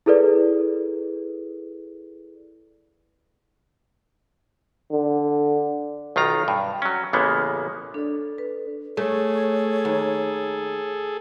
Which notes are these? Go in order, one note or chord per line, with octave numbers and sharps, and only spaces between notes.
E4 G#4 A4 B4 D5
D3
B1 D#3 F4 A#5
G2
F#3 C#4
A1 C#3 G#3 A#3 B3
D4 A4 D5
B4
A3 G#4 A4 C#5
D#2